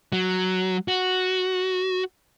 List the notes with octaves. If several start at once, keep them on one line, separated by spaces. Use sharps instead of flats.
F#3
F#4